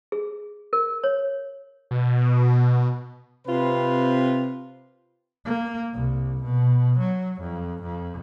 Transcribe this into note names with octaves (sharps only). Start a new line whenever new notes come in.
G#4
A#4
C#5
B2
C3 C4 F4 B4
A#3
C2
B2
F#3
F2
F2